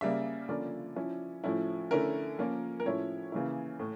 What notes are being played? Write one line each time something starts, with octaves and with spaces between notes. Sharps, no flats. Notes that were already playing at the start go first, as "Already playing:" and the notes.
C#3 G3 A#3 E5
D3 F3 A#3 C#4 F4 D5
F3 C#4 E4
A2 F3 C#4 E4
D3 A3 C#4 E4 A#4
F3 A#3 C#4 F4
A#4
A2 F3 C#4 E4 C#5
C#3 E3 A#3 E4
A2